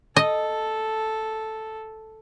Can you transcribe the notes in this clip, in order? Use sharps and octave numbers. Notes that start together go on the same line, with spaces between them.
A4 D#5